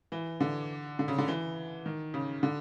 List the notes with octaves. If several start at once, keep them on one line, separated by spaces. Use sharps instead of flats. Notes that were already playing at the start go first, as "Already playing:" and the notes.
E3
D3
D3
C#3
D3
E3
D#3
C#3
D3